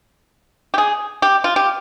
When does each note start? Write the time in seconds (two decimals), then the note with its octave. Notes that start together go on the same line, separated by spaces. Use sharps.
0.74 G4
0.78 G#4
1.22 G4
1.44 F4
1.56 G4